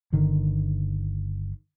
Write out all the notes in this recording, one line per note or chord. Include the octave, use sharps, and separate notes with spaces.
G1 D3 D#3